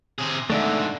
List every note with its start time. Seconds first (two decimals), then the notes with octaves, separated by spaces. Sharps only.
0.19 C3 G#4
0.50 G#2 D3 A3 D5 E5